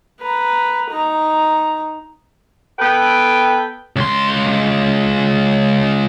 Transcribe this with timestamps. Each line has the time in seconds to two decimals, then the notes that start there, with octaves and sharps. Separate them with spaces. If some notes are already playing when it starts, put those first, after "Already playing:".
0.21 B4 A#5
0.91 D#4 A#5
2.79 B3 A4 B4 G5
3.96 C#2 C6